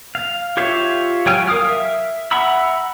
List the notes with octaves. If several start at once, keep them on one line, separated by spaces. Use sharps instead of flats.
F5
F4 G4 C#5 E5 F5
F#3 C#5 G5 G#5 F6
A#4 F5 D#6 F6
E5
E5 F#5 A#5 B5 E6